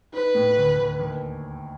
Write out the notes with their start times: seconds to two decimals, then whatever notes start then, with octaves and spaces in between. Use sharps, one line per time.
0.13 D#4 B4
0.35 A2
0.56 D2
0.78 D2
1.00 D#2